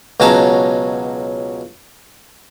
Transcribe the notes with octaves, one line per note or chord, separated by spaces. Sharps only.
C#2 B2 F#3 C#4 A5 A#5